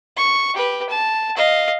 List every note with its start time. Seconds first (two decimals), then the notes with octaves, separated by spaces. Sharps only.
0.17 C#6
0.54 G4 B4
0.89 A5
1.36 D#5 F5